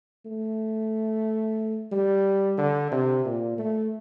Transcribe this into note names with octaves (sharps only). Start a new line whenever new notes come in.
A3
G3
D3
C3
A#2
A3